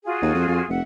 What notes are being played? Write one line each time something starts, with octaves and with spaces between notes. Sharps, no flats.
F4 F#4 G#4
D#2
F2
F2
F1 E5 F#5